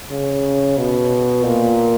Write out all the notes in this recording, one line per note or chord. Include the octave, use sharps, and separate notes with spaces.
C#3
B2
A#2